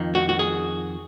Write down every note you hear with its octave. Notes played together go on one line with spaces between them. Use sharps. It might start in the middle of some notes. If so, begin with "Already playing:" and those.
Already playing: F2 D#3
F#4
F#4
G#4